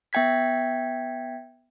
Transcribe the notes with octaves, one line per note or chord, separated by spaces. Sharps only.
B3 E5 G5 G#6 B6